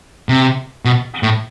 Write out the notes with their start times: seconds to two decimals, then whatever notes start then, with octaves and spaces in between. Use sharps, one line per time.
0.29 C3
0.85 B2
1.23 A2